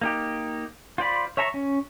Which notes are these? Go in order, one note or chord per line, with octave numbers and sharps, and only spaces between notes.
A#3 D#4 G4
F4 C5 D5 B5
C#5 E5 A5 A#5 C#6
C#4